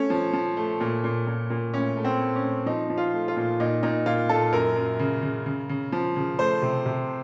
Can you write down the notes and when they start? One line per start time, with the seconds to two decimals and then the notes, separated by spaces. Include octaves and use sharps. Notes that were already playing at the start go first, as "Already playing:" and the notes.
Already playing: A3 C#4
0.10 F3
0.33 F3
0.57 A3
0.80 A#2
1.04 A#2
1.27 A#2
1.50 A#2
1.73 A2 C#4
1.97 A3
2.04 C4
2.20 A3
2.36 C#4
2.43 A3
2.66 F3 D#4
2.90 F3
2.98 F4
3.13 A3
3.28 F4
3.36 A#2
3.60 A#2 D#4
3.83 A#2 D#4
4.06 A#2 F4
4.29 A#2 A4
4.53 F#2 A#4
4.76 F#2
4.99 C#3
5.22 C#3
5.46 C#3
5.69 C#3
5.92 F3
6.16 C#3
6.39 A3 C5
6.62 C3
6.86 C3